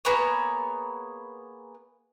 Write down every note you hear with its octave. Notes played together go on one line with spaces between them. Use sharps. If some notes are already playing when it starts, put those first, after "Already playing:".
A#3 B3 G#4 C#5